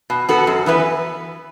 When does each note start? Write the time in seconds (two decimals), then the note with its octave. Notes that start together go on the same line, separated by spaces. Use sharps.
0.10 B2
0.29 B3 F#4 A4
0.47 F#2
0.66 E3 B3 E4 B4